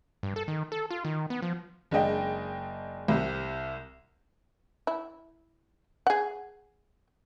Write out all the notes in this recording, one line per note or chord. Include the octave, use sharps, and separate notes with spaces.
G2
A4
D#3
A4
F4
D#3
B3
F3
F#1 G#3 D4 D5 D#5 G5
C2 C3
E4
G#4 F#5